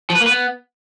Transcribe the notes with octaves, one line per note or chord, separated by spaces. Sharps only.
F3
B4
A#3
B4
B3